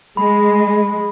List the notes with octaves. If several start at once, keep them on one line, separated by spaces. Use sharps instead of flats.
G#3 B5